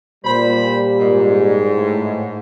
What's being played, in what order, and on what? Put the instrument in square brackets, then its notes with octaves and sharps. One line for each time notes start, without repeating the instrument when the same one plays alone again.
[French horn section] A#2 G3 [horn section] C5 B5
[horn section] G#2
[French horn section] A2